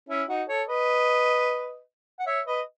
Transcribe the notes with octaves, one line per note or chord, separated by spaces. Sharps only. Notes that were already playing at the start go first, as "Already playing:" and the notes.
C#4 E4
D#4 F#4
A4 C#5
B4 D#5
F#5
C#5 E5
B4 D#5